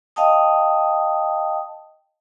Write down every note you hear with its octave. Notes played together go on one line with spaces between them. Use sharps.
D#5 F5 G5 A5 D#6